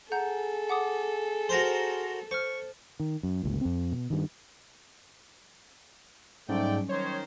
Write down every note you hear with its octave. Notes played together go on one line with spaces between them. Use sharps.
G#4 A4 F#5 A#5 G6
F#5 D6 D#6
F#4 A#4 C5
C5 C#6 F6
D#3
F#2
G1 C#2 A#2
F2 C4
B2
G2 D#3
G#2 F#3 G3 A3 C#4 D5 G5
D#3 C5 C#5